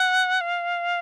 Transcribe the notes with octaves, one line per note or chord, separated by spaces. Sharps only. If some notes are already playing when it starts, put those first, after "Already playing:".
Already playing: F#5
F5